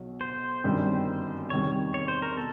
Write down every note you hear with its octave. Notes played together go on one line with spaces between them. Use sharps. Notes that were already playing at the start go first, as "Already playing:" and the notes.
Already playing: B1 B2 F#3
C5
G1 F#2 D#3 G3 C4
E2 C3 D#3 G3 C#5
C#5
C5
A#4
B2 A4